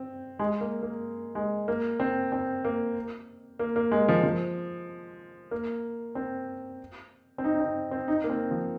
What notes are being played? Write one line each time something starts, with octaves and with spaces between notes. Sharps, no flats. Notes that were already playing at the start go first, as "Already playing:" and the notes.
Already playing: C4
G#3
A#3
A#3
G#3
A#3
C4
C4
A#3
A#3
A#3
G#3
F3
F3
A#3
C4
C4
D#4
D#4
C4
C4
D#4
A#3
C4
F3